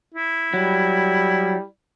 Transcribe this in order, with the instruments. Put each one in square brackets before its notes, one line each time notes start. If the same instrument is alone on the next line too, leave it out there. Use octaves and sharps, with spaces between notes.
[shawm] E4
[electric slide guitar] F#3 [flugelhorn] G3